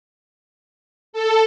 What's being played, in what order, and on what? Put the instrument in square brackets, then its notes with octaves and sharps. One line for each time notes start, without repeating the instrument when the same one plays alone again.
[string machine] A4